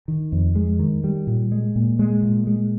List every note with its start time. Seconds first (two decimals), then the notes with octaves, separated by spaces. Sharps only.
0.08 D#3
0.32 F2
0.55 G#3
0.79 D#3
1.04 G3
1.27 A#2
1.52 G#3
1.76 A#2
1.99 G#3
2.23 A#2
2.47 G#3